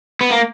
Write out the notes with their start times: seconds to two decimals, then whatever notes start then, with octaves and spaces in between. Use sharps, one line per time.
0.21 B3
0.31 A#3